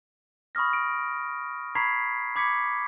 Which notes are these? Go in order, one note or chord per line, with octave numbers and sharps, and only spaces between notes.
B5 C#6 D#6 F6 A#6
D7
A#5 B5 C#6 G#6 B6 C7
B5 D6 G#6 B6 C#7